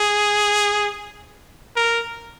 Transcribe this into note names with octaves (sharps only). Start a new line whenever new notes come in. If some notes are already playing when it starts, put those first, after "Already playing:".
Already playing: G#4
A#4